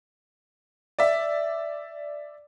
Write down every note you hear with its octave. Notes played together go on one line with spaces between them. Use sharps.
D5 E5